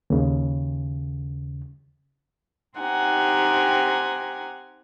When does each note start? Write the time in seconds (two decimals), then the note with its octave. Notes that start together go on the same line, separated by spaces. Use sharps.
0.10 D#2 C#3
2.77 C4 D#4 G4 F#5 G#5 A#5